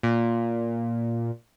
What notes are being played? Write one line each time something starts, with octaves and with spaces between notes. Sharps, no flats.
A#2